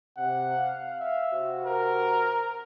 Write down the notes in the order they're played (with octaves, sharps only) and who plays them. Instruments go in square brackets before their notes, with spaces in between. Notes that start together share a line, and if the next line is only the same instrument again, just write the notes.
[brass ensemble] C3 [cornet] F#5
[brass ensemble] F5
[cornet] E5
[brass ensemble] C3 F#4 C5
[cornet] A#4